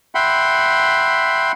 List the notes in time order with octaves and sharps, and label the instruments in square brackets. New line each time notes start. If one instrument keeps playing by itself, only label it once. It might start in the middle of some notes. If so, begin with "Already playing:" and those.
[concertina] E5 F#5 G5 B5 C6